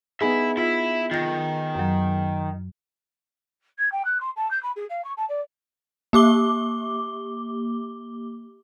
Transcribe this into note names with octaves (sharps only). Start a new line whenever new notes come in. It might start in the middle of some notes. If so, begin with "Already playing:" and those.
B3 D#4 G#4 E5 B5
E4 F4 E5
D#3 F4 A#6
F#2 F#3
G#6
G5
F#6
C6
A5
G6
B5
G#4
F5
C#6
A5
D5
A#3 G4 D6 G7